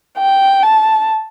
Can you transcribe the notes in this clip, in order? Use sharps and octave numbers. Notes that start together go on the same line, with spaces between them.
G5
A5